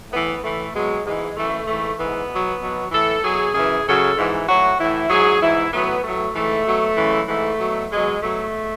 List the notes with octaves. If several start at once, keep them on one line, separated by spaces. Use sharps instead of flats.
A2 E3 B3
A2 E3 A3
B2 F#3 G#3
G#2 E3 G#3
F#2 E3 A3
G#2 E3 A3
G#2 E3 B3
B2 F#3
B2 F#3
A2 E3 A4
B2 F#3 G#4
F#2 C#3 E3 G#4
F#2 C#3 F#3 A4
G#2 E3
A2 F#3 F#4
A2 E3 E4
G#2 F#3 G#4
G#2 E3 E4
A2 F#3 B3
A2 F#3 A3
G#2 E3 A3
B2 F#3
F#2 C#3 E3
G#2 E3 A3
B2 F#3
B2 F#3 G#3
B2 F#3 A3